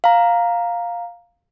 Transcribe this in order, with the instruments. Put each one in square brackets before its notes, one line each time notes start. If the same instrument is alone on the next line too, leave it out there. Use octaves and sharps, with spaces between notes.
[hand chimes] F5 A#5